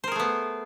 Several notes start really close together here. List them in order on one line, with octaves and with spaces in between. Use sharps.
C5 A#4 G#4 A3 B3